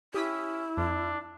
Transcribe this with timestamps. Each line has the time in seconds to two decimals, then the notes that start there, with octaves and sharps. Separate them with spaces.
0.14 C#4 E4 G4 D#6 B6
0.77 F2 D4